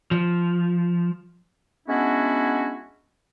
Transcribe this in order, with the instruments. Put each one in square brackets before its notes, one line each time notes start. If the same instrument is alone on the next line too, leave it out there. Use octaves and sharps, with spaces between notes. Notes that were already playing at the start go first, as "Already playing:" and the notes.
[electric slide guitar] F3
[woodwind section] G#3 B3 C#4 D4 E4 F#4